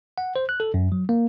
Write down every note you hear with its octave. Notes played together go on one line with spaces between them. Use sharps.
F#5
C5
F#6
A4
F#2
F#3
A#3